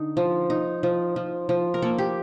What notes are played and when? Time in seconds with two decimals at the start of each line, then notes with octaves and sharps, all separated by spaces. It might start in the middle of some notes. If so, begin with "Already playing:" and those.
Already playing: D3 D#4
0.17 F3
0.50 D#4
0.83 F3
1.16 F3
1.49 F3
1.74 A#4
1.82 A#3 A4
1.98 G4